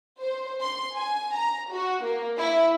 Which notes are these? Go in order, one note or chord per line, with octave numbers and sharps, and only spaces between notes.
C5
C6
G#5
A#5
F#4
A#3
E4